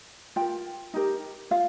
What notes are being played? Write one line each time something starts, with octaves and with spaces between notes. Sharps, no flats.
F4 A#4 G5
D#4 G4 A#4
F4 F5